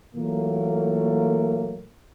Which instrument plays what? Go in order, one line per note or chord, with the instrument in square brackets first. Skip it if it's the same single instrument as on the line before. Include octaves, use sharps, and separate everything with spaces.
[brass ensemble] A#2 E3 F#3 A3 A#3